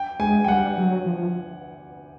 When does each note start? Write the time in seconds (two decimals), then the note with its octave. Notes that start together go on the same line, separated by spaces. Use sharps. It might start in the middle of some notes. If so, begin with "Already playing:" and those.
Already playing: G5
0.19 G#3 G#5
0.44 G5
0.48 G3 F#5
0.78 F#3
1.06 F3